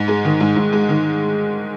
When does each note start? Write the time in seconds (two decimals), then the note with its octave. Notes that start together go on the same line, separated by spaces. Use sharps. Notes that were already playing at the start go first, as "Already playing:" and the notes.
Already playing: G#2
0.08 G#3
0.25 D#3
0.40 G#2
0.56 G#2
0.73 G#3
0.89 D#3